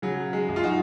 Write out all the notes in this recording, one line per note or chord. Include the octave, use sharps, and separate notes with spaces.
C#3 F#3
G#3
F#2
F4
D#4 F#4